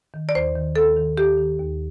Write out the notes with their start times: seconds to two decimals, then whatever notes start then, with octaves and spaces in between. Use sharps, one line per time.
0.14 D#3
0.29 D5
0.35 D#2 C5
0.56 D#3
0.76 D#2 A4
0.97 D#3
1.18 D#2 G4
1.38 D#3
1.59 D#2